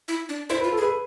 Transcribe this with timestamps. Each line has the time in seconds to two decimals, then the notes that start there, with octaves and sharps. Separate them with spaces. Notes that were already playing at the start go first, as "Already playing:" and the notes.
0.08 E4
0.29 D4
0.49 E4 C5
0.60 F4 B4
0.72 A4
0.77 G#4
0.82 B4